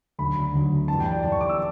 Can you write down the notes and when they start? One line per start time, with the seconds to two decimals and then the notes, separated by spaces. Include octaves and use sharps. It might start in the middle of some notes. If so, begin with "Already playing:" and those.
0.19 D2 D3 F#3 B5
0.54 D2 D3 F#3
0.88 G2 E3 B3 D4 A5
1.00 G5
1.12 D5
1.23 G2 E3 B3 D4 A5
1.32 C#6
1.41 D6
1.49 E6